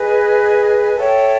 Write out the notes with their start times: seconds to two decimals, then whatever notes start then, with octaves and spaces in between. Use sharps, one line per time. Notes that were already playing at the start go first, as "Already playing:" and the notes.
Already playing: G#4 B4 D#5 G#5
0.96 A4 C#5 E5 G5